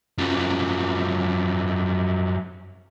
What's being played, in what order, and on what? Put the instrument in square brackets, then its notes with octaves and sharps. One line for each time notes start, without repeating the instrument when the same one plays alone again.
[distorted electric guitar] F#2 F3